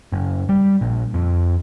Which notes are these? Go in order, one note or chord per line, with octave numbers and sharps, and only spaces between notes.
F#1
G3
A#1
F2